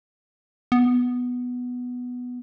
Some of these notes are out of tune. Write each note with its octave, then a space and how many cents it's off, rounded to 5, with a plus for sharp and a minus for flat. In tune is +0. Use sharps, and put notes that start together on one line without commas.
B3 +0